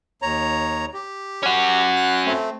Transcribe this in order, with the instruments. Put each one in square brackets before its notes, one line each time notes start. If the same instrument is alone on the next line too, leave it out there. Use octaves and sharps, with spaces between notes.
[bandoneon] D#2 C#5 A#5
G4
[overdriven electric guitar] C#4 F#4
[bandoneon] F#6
A3 C4